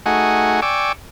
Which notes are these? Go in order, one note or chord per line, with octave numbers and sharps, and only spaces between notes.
A3 D#4 F#4 G#4 F#5 G#5
D5 G5 G#5 C#6 D6 E6